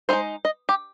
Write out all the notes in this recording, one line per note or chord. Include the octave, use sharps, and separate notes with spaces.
G#3 C4 D#4 C5
D#5
G4